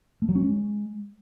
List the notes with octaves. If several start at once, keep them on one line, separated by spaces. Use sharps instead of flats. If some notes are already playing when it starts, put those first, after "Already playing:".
A3
F#3
C#4
G#3